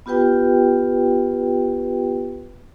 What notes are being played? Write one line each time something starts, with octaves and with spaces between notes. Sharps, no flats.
B3 F4 G4 B4 G5